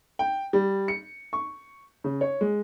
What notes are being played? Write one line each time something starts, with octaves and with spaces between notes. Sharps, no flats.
G5
G3
C#7
C#6
C#3
C#5
G#3